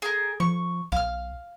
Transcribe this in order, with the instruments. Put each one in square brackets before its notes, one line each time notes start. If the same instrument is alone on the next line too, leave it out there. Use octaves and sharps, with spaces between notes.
[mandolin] G#4 A#4
[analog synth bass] F3 [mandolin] C#6
[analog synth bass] B1 [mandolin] F5 F6